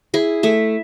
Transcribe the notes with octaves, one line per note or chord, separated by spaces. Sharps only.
E4 G#4
A3 E5